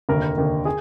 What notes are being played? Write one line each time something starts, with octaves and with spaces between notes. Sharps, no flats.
F1 D#2 D3 A#4
F1 D#2 D3
G#4